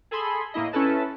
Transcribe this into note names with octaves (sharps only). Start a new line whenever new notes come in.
G#4 A4 G#5 B5 C6
A2 A#3 E4 D#5
C#4 E4 A4 B4 A5